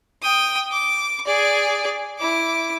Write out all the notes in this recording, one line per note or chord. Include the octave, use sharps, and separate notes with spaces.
G5 D#6
D6
G#4 D5
E4 D6